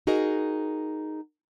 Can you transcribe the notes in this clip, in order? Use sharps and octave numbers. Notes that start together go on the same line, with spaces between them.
D#4 F#4 G#4 A#4 D#5